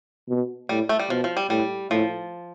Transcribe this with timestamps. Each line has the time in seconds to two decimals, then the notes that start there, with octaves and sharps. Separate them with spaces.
0.29 B2
0.69 A2 G3
0.89 A3
0.99 G3
1.10 B2 F3
1.24 F3
1.37 G3
1.50 A2 G3
1.91 A2 F3